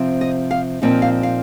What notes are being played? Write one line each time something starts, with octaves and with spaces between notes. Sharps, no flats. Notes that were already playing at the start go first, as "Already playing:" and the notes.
Already playing: C3 F3 C4
D#5
F5
A#2 F3 C4 D#4
F5
F5